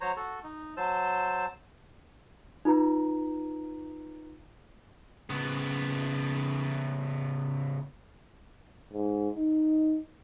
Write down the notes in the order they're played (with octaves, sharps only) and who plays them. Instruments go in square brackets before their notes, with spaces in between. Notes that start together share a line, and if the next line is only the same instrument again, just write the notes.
[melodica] F#3 C5 C#5 A#5
F#4 A4
D#4
F#3 C5 A5 E6
[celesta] D#4 F4 B4 A#5
[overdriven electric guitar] C#3 B3
[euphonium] G#2
D#4